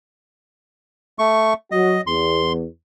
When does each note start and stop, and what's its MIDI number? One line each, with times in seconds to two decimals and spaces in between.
1.19 1.53 57
1.19 1.53 85
1.71 1.97 54
1.71 1.97 66
1.71 2.01 75
2.07 2.64 40
2.07 2.52 84